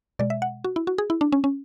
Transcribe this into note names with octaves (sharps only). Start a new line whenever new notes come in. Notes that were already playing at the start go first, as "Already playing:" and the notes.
B2 G#3 D5
E5
F#5
F#4
E4
F#4
G#4
E4
D4
C#4
C#4